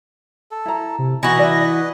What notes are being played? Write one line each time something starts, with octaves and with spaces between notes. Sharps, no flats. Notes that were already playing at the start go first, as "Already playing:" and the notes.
A4
E4 A#5
C3
E3 F#4 B4 D#5 A#6
E4 D5